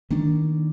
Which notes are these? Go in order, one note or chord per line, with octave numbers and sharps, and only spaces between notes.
D#3 A#3 D4